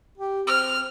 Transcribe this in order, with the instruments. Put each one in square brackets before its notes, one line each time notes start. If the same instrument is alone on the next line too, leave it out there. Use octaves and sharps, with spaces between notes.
[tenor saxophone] G4
[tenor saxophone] C4 [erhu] F6